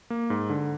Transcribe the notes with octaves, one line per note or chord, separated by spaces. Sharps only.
A#3
G#2
D3